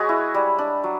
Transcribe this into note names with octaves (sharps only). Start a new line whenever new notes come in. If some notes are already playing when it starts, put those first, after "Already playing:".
Already playing: G#3 F#4 G#4 B4 C#5
E4
G3
D4
F#3